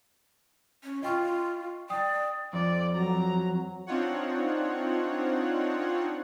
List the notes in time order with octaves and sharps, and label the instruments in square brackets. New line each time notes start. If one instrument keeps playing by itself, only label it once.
[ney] C#4
[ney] F4 [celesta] D#5 G5 C#6
[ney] D5 [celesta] G5 D#6
[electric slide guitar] F2 [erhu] D5
[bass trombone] F#3 [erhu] A#5
[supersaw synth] C4 D4 D#4 F4 C#5 F#5